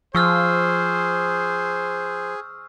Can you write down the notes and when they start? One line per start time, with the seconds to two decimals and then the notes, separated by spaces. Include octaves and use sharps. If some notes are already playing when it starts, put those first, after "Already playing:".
0.15 F3 G#4 C5 C#6 E6 F6